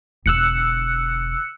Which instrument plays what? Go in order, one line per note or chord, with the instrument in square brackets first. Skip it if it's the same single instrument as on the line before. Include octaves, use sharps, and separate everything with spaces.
[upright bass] E1 D3 [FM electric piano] E6 F#6 C#7